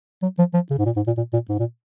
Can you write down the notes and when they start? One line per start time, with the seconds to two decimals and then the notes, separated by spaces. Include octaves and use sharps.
0.22 F#3
0.39 F3
0.54 F3
0.70 C#3
0.79 G#2
0.86 A#2
0.96 G#2
1.07 A#2
1.17 A#2
1.33 A#2
1.49 G#2
1.59 A#2